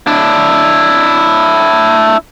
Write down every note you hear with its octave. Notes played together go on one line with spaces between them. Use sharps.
D4 E4